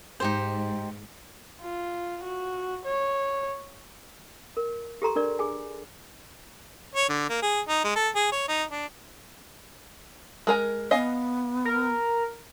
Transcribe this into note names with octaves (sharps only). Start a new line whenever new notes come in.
G#2 D#4 G4 C5
F4
F#4
C#5
A#4
G4 A4 A#5 C6
D4 A#4 D5
G#4 G#5
C#5
D3
A#3
G#4
D#4
G#3
A4
G#4
C#5
D#4
D4
G#3 A#4 G#5
B3 D#5 F5 G#5
A#4